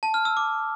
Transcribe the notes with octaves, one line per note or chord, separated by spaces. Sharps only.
A5
F6
E6
D6